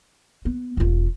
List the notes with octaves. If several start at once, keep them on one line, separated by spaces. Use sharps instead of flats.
B3
E1 F4